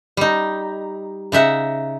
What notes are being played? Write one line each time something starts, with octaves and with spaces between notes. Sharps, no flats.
G3 D#4
C#3 D#4 E5 F#5